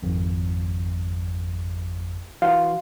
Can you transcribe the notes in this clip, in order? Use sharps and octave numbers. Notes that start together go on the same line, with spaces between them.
G#1 F2
E3 F#4 F5 F#5 C6